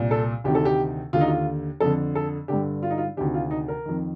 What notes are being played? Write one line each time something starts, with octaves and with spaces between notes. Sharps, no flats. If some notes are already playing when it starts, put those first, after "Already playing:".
Already playing: C2 A#2
A4
D2 C3 D#3 G4
A4
G4
D#2 D3 F4
D#4
F4
F2 D3 A4
A4
G2 D3 G4
F4
D#4
F4
D2 C3 D#3 G4
F4
D#4
A#4
F2 D#3